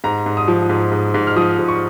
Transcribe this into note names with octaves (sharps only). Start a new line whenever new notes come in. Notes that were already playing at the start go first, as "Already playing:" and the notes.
G#2 A#5
G#2
D#6
F3
G#2
G#2
G#2
F6
F3 D#6
G#2
C#6